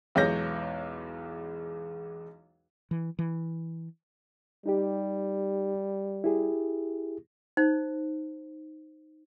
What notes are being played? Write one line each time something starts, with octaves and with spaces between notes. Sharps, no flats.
B1 E2 G#3 C#5 G6 A#6
E3
E3
G3 D#4 G4
E4 G4 G#4
D#4 C5